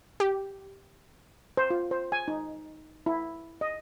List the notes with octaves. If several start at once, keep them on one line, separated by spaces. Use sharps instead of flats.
G4
C5
F4
C5
G#5
D#4
E4
D#5